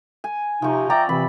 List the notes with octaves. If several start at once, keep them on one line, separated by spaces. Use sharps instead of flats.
G#5
C3 F3 D#4 C#6
D5 E5 G5 A#5
C3 E3 C4 B5